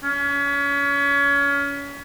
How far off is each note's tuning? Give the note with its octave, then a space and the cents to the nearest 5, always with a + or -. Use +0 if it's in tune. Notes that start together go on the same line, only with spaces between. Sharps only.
C#4 +30